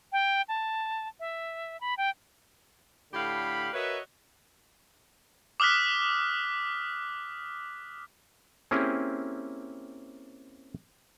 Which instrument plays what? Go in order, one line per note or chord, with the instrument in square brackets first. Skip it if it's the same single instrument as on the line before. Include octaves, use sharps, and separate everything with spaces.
[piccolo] G5
A5
E5
B5
G5
[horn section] A2 D3 G4 F5 B5
F#4 A#4 B4 C#5 D#5 E5
[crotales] D6 D#6 F6 F#6 B6
[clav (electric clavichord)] A#3 C4 C#4 E4 G4 G#4